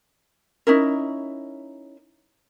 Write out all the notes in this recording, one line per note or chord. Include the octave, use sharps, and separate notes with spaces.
C#4 D#4 E4 A#4